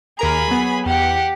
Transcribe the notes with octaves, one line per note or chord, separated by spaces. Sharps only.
D#2 G#4 A#4 A#5 B5
F#3 B3
E2 G4 F#5